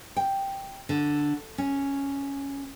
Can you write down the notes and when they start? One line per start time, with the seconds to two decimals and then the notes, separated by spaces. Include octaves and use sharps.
0.17 G5
0.89 D3
1.58 C#4